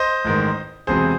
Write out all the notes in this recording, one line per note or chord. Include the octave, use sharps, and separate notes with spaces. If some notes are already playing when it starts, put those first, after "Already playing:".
Already playing: C5 D#5
A1 G#2 D#3
E1 E2 C3 F#3 G#4 C5